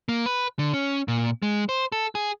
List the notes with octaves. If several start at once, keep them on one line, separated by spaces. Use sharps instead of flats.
A#3
B4
D3
C#4
A#2
G#3
C5
A4
G#4